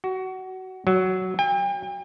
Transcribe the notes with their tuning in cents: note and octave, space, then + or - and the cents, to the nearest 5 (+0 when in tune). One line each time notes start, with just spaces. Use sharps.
F#4 +20
F#3 +10
G5 +40